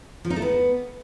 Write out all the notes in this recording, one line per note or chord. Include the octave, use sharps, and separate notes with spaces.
F3
D#4
A3
B3